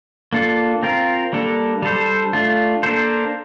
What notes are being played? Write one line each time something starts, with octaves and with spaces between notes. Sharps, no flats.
A#3 D4 F4 A4
C4 F4 A#4
G3 A#3 D4 A4
G3 D4 A4 C5
A3 D4 F4
A#3 D4 A4 C5